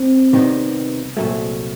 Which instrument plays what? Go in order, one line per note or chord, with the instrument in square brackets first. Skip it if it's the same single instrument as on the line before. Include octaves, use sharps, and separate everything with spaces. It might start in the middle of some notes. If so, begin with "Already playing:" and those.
Already playing: [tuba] C4
[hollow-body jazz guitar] C3 D#3 G3 B3 D#4
C2 A#2 F#3 A3